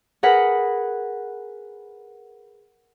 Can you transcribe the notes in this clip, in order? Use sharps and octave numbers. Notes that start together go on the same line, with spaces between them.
G#4 A#4 B4 F#5